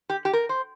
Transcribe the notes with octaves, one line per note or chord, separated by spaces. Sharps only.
G4
G4
A#4
C5